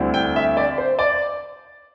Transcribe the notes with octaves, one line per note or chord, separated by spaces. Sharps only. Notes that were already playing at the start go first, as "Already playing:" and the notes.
Already playing: D2 D3 G3 C4 E4
G5
E5
D5
C5
D5